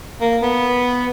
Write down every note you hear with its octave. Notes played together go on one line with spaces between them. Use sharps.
A#3
B3